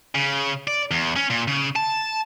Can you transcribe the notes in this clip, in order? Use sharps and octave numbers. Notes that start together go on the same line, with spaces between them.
C#3
D5
E2
C#4
A#2
C#3
A5